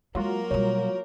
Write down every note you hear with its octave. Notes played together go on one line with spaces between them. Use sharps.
F#3 G#3 A#3 F4 F#4 A#4
B2 G3 C#5